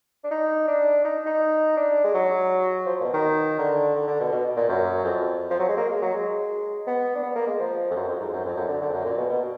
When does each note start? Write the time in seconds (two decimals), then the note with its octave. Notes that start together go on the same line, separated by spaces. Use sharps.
0.24 D4
0.31 D#4
0.68 D4
1.05 D#4
1.26 D#4
1.77 D4
2.04 G#3
2.14 F#3
2.86 F3
3.00 A#2
3.04 B2
3.14 D#3
3.59 D3
3.95 D3
4.07 D3
4.20 B2
4.32 B2
4.57 A#2
4.69 F#2
5.04 F2
5.51 F3
5.59 F#3
5.69 G#3
5.77 A#3
5.90 G#3
6.02 F#3
6.14 G#3
6.87 B3
7.15 D4
7.23 B3
7.35 A#3
7.47 G#3
7.60 F3
7.91 F2
7.96 F#2
8.08 F2
8.20 G#2
8.33 F#2
8.45 F2
8.57 F#2
8.68 D3
8.81 D3
8.89 F2
8.93 F#2
9.05 A#2
9.18 B2
9.30 B2